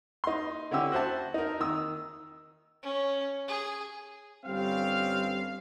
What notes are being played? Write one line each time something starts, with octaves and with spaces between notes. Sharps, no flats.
D#4 C6
D3 C#4 E4 G4 E6
F#4 C5 E5 A5
D#4 A#4
D#3 D#6 E6
C#4
G#4
G1 G3 C4 C#4 F5